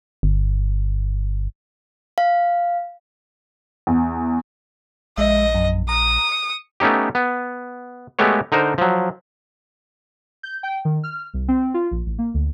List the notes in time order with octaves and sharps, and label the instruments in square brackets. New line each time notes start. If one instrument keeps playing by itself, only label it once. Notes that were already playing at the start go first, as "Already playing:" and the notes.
[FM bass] G1
[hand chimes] F5
[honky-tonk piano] E2
[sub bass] A#1 [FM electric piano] G#3 E5 [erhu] D#5
[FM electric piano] F#2
[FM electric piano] A#5 [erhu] D#6
[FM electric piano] C#7
[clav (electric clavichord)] A3 B3 C#4 D#4 G4
B3
G#3 A3 B3 G4 C#5
D3 D#4 A#4 C5
F3 F#3
[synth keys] G6
G5
D#3
F6
C2
C4
F4
A#1
A1
A#3
D2